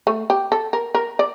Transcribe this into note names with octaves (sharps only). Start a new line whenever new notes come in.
A3
G4
A4
A#4
A#4
D5